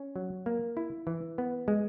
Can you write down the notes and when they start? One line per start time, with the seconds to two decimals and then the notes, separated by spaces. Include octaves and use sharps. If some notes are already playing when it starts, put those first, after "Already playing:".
Already playing: C#4
0.16 F#3
0.46 A#3
0.77 E4
1.07 E3
1.38 B3
1.68 G#3